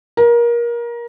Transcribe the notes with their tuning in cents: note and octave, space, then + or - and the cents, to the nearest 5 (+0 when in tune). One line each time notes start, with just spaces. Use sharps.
A#4 +25